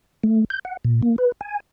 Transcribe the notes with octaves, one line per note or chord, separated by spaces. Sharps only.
A3
G6
F#5
A#2
A#3
B4
G#5